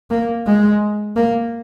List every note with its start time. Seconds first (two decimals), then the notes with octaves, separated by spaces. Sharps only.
0.10 A#3
0.46 G#3
1.16 A#3